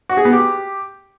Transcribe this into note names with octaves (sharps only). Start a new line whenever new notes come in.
F#4
G#4
B3
G4